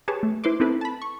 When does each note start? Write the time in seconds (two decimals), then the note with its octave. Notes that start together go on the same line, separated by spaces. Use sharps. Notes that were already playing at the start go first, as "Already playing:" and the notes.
0.08 G4 G#4 B4 C#5 A5
0.23 A3
0.44 E4 B4 C5 C6 D6
0.60 C4 D#4 E4 A4 B4
0.81 A5 B5
1.02 C#6